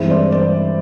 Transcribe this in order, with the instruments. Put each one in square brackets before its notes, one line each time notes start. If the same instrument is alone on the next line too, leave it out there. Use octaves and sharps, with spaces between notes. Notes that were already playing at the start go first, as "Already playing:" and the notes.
Already playing: [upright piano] G2 E3 G#3 C4
[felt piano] C5 D5
C5 D5